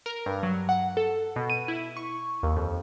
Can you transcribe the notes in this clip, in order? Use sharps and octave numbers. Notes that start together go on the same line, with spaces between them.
A#4
G2
F#3
F#5
A4
B2
D#7
E4
C#6
D#2
F2